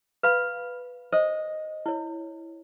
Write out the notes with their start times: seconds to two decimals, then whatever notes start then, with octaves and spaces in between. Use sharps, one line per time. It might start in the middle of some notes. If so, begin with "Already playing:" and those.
0.23 B4 F5 B5
1.12 C5 D#5
1.86 E4 C#5